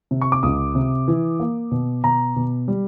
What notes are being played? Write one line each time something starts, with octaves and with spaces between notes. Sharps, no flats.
C3
C#6
D6
C#2 D#6
C3
E3
A#3
B2
B2 A#5
B2
G3